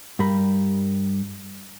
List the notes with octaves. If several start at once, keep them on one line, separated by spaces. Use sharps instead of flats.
G2 G3 A#4 B5